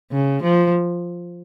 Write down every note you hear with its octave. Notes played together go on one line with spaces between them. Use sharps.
C#3
F3